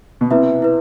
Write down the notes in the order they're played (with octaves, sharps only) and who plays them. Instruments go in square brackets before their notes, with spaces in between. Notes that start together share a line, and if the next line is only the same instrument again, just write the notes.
[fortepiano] B2
[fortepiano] C3 [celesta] E4 B4 E5
[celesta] E4 B4